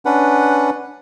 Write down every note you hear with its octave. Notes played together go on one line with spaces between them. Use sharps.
C#4 D4 B4 F#5